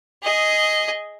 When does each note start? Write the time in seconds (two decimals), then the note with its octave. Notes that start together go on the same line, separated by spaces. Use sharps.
0.23 G#4 D#5